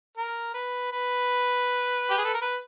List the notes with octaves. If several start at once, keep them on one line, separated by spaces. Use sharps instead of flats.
A#4
B4
B4
G4
G#4
A4
A#4
B4